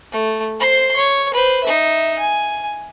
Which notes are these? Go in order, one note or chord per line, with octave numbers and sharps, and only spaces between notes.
A3
C5 C6
C#5
B4 C5
D#4 E5
G#5